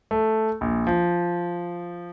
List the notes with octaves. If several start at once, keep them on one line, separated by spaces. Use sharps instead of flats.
A3
A#1
F3